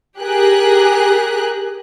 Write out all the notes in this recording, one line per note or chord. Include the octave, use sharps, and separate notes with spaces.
G4 G#4 A#4 F#6